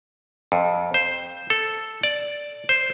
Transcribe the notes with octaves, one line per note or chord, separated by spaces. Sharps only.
F2
C5
A4
D5
C5